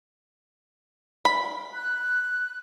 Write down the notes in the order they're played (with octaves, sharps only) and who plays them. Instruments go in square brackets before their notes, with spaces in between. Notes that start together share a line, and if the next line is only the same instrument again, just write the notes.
[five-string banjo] B5
[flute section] F#6